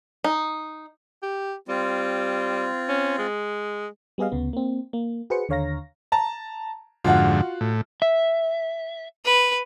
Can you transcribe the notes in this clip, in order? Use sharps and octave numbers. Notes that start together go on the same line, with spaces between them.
D#4
G4
G3 C4 F4
C#4
G#3
G3 B3 G#4 D#5 F5
D2 C#3 B3
A#3 C4
A#3
F#4 G#4 B4 C5 C#7
D#2 D3 C#5 F5 A#5 A#6
A5 A#5
F2 G#2 D3 F4 F#4 F#5
A2
E5
B4